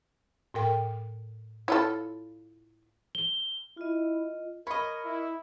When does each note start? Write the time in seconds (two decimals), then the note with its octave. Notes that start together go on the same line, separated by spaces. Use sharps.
0.54 A2 A#4 G5
1.68 E4 F4 A4 C#5
3.15 G7
3.77 E4 F4 D#5
4.67 A#4 C#5 D#5 B5
5.05 E4